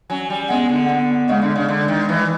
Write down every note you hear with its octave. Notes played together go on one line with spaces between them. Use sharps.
F#3 C#4
G3
G#3 B3
D3
B3
C#3 G#3
D3
C#3
D3
D#3
E3